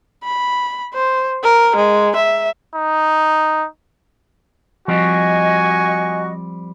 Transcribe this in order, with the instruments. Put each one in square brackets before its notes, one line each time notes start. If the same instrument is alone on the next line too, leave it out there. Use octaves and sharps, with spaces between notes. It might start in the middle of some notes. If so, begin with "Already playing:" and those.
[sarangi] B5
C5
A#4
G#3
E5
[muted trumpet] D#4
[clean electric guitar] F3 G3 C4 [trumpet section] F#4 C#6 [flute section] D#5 [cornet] G#5